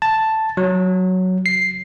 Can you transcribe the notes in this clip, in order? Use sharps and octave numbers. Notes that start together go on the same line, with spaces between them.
A5
F#3
C7